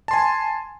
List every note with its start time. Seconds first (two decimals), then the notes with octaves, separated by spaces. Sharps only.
0.08 A5
0.11 C6
0.13 G#5